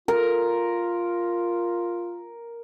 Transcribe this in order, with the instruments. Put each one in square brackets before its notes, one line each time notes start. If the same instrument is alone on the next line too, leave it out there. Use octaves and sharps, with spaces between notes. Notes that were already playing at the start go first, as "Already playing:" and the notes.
[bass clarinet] F4 [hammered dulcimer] A#4